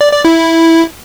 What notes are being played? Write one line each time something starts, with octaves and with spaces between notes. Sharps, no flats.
D5
D5
E4